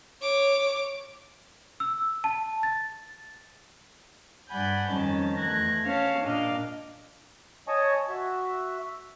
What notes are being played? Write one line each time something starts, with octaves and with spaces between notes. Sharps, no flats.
C#5 D6
E6
A5
A6
G2 D5 F#5 G#5 B5 G6
F2 D#3 G3 C#4 A5
E2 A3 F#6 G#6 A#6
C#4 F5 A5
A#2 D4 D#5 F5
C#5 D#5 G#5 A5 C#6 D#6
F#4 E5